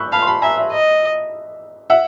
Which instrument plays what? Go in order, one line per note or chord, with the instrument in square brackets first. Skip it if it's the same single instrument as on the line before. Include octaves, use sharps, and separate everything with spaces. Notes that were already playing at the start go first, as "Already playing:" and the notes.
Already playing: [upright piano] B5 C#6 E6 F#6 G6
[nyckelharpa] F5 [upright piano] A5 B5
[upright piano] C6
A5 B5
[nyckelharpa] E5 [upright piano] G#5 A#5
[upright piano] E5
[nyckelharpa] D#5
[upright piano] E5 F#5